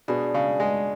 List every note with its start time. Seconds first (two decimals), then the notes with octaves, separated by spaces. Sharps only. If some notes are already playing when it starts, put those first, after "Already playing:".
0.08 B2 D4 G#4 D5
0.34 C#3
0.60 G#3